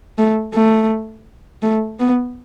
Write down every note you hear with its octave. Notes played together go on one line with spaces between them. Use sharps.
A3
A3
A3
B3